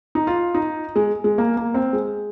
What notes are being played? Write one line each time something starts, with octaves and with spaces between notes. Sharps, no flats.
D#4
F4
D#4
G#3
G#3
A#3
A#3
C4
G#3